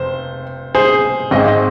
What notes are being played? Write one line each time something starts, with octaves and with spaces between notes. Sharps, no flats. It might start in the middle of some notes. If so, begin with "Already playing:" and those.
Already playing: F1 C5
G#4 C5
G#1 G#2 G#3 C4 D#5
D#5